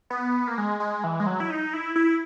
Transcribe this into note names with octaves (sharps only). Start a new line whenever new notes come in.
B3
A#3
G#3
G#3
E3
G#3
F#3
E4
D#4
E4
E4